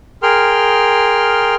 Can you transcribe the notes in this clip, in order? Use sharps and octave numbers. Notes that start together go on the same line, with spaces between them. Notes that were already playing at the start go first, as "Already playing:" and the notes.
G#4 A#4 G5 C6 F6